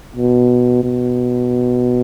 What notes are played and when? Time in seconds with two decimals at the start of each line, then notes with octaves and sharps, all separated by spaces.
0.16 B2
0.84 B2